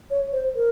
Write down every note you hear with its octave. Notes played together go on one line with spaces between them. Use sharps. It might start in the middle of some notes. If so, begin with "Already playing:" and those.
C#5
C5
A#4